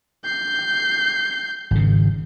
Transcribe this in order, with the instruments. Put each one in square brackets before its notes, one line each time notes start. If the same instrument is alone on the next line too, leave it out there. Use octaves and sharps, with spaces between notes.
[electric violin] G6 C7
[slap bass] G#1 C#3